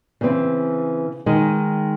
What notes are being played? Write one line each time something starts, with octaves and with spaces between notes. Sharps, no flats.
C#3 E3 C4
D#3 G#3 D#4